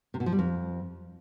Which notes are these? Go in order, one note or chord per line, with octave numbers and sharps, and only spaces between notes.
C3
B2
F3
G3
F2